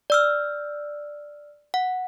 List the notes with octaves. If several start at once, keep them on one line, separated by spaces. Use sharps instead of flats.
D5 E6 F6
F#5